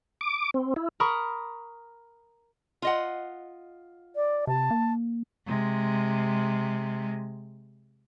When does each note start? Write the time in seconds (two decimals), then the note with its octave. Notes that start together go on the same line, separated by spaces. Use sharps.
0.21 D6
0.54 C4
0.76 E4
1.00 A#4 A#5 B5 C#6 D#6
2.82 F4 D#5 F#5
4.16 D5
4.47 C3 A5
4.71 A#3
5.47 C3 G#3